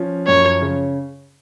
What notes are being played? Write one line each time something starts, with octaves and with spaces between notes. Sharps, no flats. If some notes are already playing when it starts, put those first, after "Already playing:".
Already playing: F3 C#4
F#2 C#5
C#3